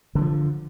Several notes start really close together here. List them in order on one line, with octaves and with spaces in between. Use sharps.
D3 D#3 F3